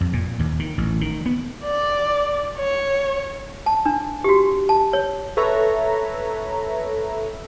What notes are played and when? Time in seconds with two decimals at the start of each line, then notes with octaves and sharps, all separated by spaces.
0.01 F2
0.13 A#2
0.39 D#2
0.59 D#3
0.78 A1
1.01 D#3
1.26 B3
1.64 D5
2.58 C#5
3.66 A5
3.86 D4
4.24 F#4 G4
4.69 A5
4.93 C#5
5.37 A4 B4 C#5 E5 A#5